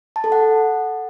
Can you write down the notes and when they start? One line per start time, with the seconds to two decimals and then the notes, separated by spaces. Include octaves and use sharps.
0.16 A5
0.24 A4
0.32 F#5